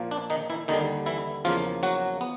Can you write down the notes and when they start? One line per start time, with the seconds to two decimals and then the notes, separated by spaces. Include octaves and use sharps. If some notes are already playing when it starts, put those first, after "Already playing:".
Already playing: A#2 F3 A#3
0.11 D4
0.30 D#3 D#4
0.50 E3 E4
0.68 D#2 D3 D#3 G3 D#4
1.06 E3 E4
1.45 E2 C#3 F3 A#3 F4
1.83 F#3 F#4
2.21 B3